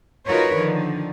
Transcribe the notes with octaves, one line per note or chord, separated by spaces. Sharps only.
D#4 F4 F#4 A#4 B4 C#5
D3 D#3 F3